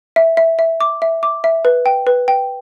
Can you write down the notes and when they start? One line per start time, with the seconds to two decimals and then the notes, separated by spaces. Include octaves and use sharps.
0.16 E5
0.37 E5
0.59 E5
0.81 D6
1.02 E5
1.23 D6
1.44 E5
1.65 B4
1.86 G5
2.07 B4
2.28 G5